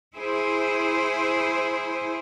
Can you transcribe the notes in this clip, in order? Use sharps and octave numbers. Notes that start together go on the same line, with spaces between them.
E4 G#4 C5